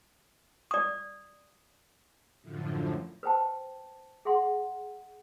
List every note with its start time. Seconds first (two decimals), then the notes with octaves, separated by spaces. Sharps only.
0.71 D5 D#6
2.41 F#2 A2 D3 F3
3.23 B4 C5 G5 A5
4.25 G#4 E5 F#5 C6